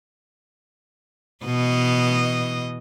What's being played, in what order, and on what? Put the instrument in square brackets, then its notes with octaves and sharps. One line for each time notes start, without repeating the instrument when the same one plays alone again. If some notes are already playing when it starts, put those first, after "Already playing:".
[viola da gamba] B2 E3 D#5